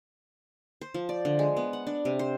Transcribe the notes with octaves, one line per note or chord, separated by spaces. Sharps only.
C5
F3
D5
D3
G#3
B3
F#5
D4
C3
C5